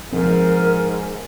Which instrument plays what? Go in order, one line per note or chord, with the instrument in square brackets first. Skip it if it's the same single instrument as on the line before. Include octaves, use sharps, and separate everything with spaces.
[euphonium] G#2 [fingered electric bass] F3 C4 [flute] A#4